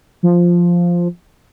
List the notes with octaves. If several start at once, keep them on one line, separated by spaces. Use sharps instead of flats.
F3